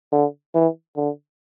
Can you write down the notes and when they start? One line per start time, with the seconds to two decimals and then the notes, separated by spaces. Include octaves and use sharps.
0.12 D3
0.54 E3
0.96 D3